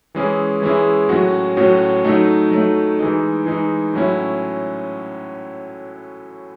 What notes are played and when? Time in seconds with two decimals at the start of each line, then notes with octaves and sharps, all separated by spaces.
0.15 E3 G#3 C#4 E4 G#4
0.62 E3 G#3 C#4 E4 G#4
1.09 A2 F#3 C#4 F#4
1.57 A2 F#3 C#4 F#4
2.05 F#3 A3 D#4
2.51 F#3 A3 D#4
2.99 E3 G#3 D#4
3.46 E3 G#3 D#4
3.94 A2 F#3 C#4 E4